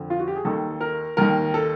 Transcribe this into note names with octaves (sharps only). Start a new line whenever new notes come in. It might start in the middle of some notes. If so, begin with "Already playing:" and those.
Already playing: F2 D3
F4
F#4
G4
G#4
D#2 D#3 A4
A#4
D#2 D#3 A#4
A4